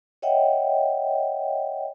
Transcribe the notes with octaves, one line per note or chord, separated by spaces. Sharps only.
C#5 D#5 E5 F#5 G5